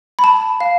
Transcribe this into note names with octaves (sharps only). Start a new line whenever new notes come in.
B5
A5
F5